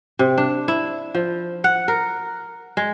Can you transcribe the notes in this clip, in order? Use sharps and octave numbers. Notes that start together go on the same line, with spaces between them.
C3
D4
E4
F3
F#5
A#4
G#3